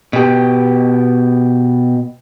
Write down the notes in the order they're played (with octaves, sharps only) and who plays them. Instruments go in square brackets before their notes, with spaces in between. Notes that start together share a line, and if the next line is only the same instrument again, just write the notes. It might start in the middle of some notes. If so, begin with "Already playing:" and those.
[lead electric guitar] B2 G4